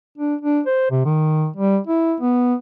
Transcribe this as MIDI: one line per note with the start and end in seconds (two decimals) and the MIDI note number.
0.18 0.35 62
0.41 0.61 62
0.66 0.90 72
0.91 1.05 48
1.05 1.48 51
1.57 1.79 55
1.87 2.15 64
2.20 2.55 59